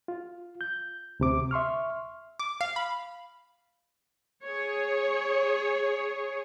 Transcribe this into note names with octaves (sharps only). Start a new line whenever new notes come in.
F4
G6
D2 C3 D6
E5 C6 C#6 F6
D6
F5
B5
G#4 C#5